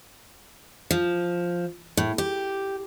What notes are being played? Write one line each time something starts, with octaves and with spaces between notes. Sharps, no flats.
F3
A2
G4